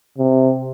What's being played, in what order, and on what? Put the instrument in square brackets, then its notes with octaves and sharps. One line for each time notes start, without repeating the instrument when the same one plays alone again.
[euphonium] C3